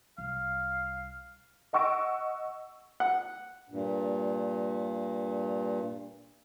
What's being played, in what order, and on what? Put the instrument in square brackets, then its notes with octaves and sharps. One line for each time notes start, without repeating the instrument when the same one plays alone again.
[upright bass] C2 [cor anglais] F5
[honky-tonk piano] D#5 F#5 C#6 E6 A#6 D7
[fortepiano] F#5
[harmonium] G2 A#2